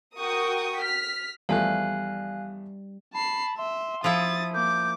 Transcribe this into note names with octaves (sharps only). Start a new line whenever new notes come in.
F#4 A#4 G5 C#6 D#6
F6 B6
E2 F3 G3 A3 F5 G#5 F#6
A5 B5 C7
E5 C6
F3 E4 D#6 A6
A#3 D6 G6